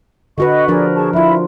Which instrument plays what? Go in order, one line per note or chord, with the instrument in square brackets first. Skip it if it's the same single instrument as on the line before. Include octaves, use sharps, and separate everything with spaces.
[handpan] D3 F#4 B4 [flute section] D#5 F#5 C#6
[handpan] F3 D4 A#4 [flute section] G#4 D5
[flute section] G#4 A5 C#6
[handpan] F3 F4 [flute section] E4 E5 B5